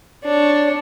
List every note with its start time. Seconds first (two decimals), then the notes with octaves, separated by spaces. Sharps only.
0.24 D4 C#5